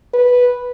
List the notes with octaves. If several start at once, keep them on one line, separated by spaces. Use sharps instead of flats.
B4